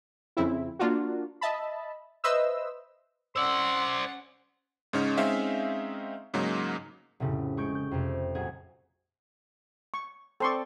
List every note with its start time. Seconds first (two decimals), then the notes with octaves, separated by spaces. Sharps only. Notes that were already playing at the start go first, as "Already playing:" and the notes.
0.37 F2 C#3 C4 E4
0.79 A#3 D4 F4 F#4
1.41 D#5 E5 A5 B5
2.24 B4 C5 D#5 E5 E6
3.36 C#4 C5 D5 F#5 C6 E6
4.93 G#2 C#3 C#4 D#4 C#5
5.17 G#3 C4 C#4 D#4 E5 F5
6.34 G#2 C#3 F#3 A#3 D#4
7.20 F1 A2 C#3
7.57 G#3 C#6 G6 D7
7.75 G6
7.91 F2 C3 A3
8.35 A#1 F#3 G#4 G#6
9.94 C#6
10.40 C4 A4 D5 C6 C#6